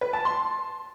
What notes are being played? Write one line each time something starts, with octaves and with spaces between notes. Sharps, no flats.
B4
A5
C6